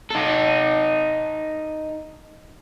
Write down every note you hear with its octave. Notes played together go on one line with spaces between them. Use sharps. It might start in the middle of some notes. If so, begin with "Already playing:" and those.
D#4 A4